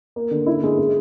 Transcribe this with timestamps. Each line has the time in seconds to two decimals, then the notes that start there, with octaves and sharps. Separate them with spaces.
0.16 A#3
0.31 D3
0.46 E4
0.63 G#3
0.79 G#3